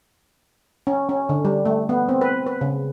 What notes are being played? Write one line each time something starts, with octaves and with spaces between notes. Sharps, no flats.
C#4
C#4
D3
G3
A3
B3
C4
B4
B4
C#3